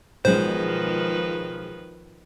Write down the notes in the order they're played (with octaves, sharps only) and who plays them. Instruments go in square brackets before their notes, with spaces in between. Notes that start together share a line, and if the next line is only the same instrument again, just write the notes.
[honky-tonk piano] B1 G#3 [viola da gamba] D#3 F3 B4 [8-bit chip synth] C5